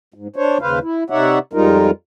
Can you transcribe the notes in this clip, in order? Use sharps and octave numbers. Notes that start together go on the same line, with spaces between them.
G#2
D4 C5 C#5
D#2 C#3 B4 C5 F5
E4
C3 D#4 C#5 D5 E5 F#5
F2 G3 G#3 D#4 F4 A#4